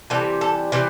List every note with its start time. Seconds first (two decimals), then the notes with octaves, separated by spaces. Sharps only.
0.10 C3 E3 G3 A4
0.41 A4
0.72 C3 E3 G3